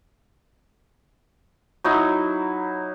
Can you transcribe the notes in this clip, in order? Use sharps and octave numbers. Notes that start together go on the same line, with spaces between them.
F#3 D#4 E4